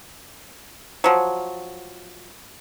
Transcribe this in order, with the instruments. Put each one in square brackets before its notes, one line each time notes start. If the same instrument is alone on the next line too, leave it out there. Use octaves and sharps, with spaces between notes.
[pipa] F3 F#3